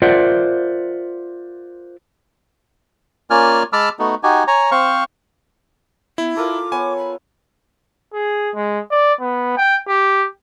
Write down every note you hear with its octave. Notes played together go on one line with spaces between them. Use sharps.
F4 A#4 C5 D5 E5 F#5
A#3 C#4 F4 D5 G#5 F6
G#3 A5 B5 D6 E6 F6
A3 B3 D#4 F#4
D#4 F#4 G4 G#5
C#5 G#5 A#5
C4 C5 F5 C#6
B3 E4
F4 A4 A#4 F5 D6
B3 C#5 G#5
B5
G#4
G#3
D5
B3
G5
G4